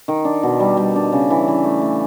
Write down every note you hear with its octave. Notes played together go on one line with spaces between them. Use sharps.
D#3
D4
B2
G3
G3
D4
C#3
E3
E3
A3
A3